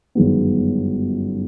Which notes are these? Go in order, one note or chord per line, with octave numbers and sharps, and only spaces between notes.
G1 F#2 D#3 G#3 B3